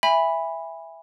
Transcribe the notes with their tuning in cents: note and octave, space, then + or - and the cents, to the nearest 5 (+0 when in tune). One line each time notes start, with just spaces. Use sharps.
E5 +5 G#5 -25 B5 +0